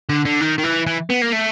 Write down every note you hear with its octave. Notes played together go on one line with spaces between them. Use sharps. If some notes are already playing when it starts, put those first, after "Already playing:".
D3
D3
D#3
D#3
E3
E3
B3
A#3
A3